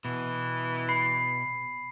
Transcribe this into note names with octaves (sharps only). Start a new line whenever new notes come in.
B2 E3
B5 C7